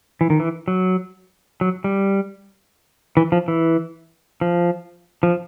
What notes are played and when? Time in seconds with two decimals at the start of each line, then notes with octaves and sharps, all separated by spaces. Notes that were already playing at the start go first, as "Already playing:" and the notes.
0.21 E3
0.30 D#3
0.40 E3
0.68 F#3
1.61 F#3
1.84 G3
3.17 E3
3.32 F3
3.48 E3
4.41 F3
5.23 F3